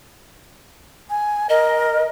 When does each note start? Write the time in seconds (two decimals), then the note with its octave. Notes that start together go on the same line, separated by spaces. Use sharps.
1.10 G#5
1.49 A#4 D#5